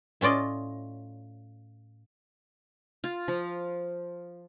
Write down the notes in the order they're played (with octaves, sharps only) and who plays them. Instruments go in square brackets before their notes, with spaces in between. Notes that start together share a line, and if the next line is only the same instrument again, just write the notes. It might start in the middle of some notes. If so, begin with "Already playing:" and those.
[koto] A2 C#4 F4 D5 D#5
[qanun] F4
F3